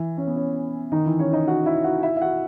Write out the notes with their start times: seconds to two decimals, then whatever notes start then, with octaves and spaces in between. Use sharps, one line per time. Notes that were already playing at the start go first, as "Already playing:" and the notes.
Already playing: E3 E4
0.18 C#4
0.27 B3
0.36 C#4
0.92 D#3 D#4
1.06 E3 E4
1.19 C#4 C#5
1.33 D#4 D#5
1.47 F#4 F#5
1.66 E4 E5
1.84 F#4 F#5
2.03 E4 E5
2.16 E5
2.21 F#4 F#5